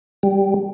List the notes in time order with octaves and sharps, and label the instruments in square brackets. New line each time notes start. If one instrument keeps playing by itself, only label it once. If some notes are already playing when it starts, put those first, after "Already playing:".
[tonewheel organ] G3